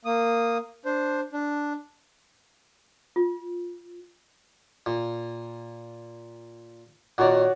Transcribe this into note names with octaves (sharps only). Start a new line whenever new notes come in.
A#3 D#6
D4 C5
D4
F4
A#2
A#2 D#3 F#4 C#5 D5